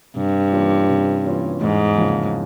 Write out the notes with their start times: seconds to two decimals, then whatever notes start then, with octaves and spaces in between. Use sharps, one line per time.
0.16 G2 C3
0.52 E3 A#3 C#4 F4
0.89 C3
1.25 E3 A#3 C#4 F4
1.60 E2 G#2
1.97 C#3 F3 A#3